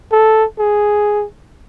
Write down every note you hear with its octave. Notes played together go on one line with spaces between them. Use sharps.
A4
G#4